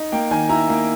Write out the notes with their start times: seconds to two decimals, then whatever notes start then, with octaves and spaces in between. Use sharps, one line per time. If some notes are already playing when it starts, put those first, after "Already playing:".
Already playing: D#4
0.12 A#3 G5
0.31 D#3 G#5
0.49 E4 A#5
0.69 A#3